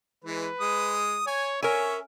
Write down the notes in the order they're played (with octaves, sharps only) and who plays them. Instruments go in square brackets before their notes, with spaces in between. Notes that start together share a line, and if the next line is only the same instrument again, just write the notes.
[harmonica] E3 G#3 [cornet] B4
[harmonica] G#3 D#6
[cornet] C#5 [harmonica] G#5
[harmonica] C#4 E5 [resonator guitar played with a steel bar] A#4 G#5 [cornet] C#5